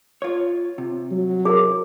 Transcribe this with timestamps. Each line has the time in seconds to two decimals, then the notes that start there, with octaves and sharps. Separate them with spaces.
0.22 F4 C#5
0.78 C3
1.11 F#3
1.45 G#4 A#4